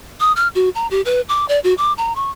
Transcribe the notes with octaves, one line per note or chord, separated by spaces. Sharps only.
D#6
F6
F#4
A#5
G4
B4
D6
D5
F#4
D6
A#5
C#6